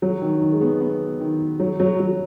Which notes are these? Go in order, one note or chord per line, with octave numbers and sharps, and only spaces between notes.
F#3
D#3
D#3
G#3
B3
B3
D#3
F#3
F#3
F#3